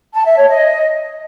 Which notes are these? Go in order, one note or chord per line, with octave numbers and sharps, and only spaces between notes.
A5
E5
C#5
D#5